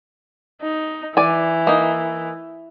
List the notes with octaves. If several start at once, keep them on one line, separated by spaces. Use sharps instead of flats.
D#4
E3 D5 G#5
A#3 D#4